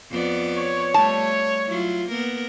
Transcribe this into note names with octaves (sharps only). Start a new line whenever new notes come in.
F2 B3 D5
C#5
G3 A3 A5
F#3 E4 F4
A#3 B3 A#4